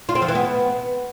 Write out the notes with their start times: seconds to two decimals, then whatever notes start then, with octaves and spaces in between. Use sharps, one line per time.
0.09 F4
0.15 C4
0.22 F3
0.28 E3
0.35 B3